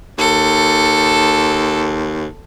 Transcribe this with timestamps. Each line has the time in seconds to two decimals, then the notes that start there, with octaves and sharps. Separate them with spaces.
0.18 D#2 A4